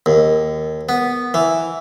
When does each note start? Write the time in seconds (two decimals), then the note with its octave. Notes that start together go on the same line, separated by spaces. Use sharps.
0.06 D#2
0.89 B3
1.34 E3